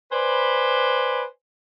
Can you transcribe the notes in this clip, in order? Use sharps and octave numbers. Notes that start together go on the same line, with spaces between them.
B4 C5 D5 G#5 B5